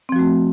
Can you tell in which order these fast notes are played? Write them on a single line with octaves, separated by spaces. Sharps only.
C4 F3 F#4 A3